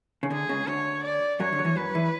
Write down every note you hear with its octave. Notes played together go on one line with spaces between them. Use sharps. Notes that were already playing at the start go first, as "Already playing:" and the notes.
C#3
D2 D3 G#4
C#2 C#3
D2 D3 C#5
D5
F#2 F#3 C#5
D2 D3
F#3
E2 E3
F#2 F#3 B4
E2 E3